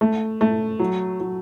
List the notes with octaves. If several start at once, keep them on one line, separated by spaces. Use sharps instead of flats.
A3
A3
F#3
F#3